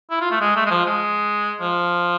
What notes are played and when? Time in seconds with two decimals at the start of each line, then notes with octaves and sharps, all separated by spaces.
0.11 E4
0.21 F4
0.31 A3
0.41 G#3
0.56 A3
0.66 G#3
0.71 F3
0.86 G#3
1.61 F3